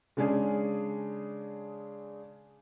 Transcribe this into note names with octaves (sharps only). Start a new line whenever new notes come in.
C#3 G#3 D4 G#4